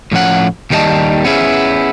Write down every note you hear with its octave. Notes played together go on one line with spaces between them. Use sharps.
A2 F3 C#4 F#5
D#2 D#3 G3 A4 D#5 A5
B3 C#4 E4 G#4